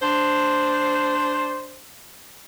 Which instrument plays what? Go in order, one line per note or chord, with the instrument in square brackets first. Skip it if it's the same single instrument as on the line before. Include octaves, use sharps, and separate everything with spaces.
[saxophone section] D4 C5